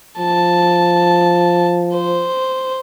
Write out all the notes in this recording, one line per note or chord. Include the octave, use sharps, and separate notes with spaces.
F3 A5
C5